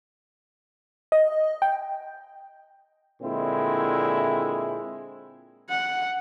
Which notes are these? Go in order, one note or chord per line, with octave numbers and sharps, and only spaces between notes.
D#5
G5
A#2 D3 G#3 C4 E4
F#5